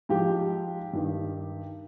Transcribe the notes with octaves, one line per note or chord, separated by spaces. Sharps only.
G#2 F3 G4
G2 D#3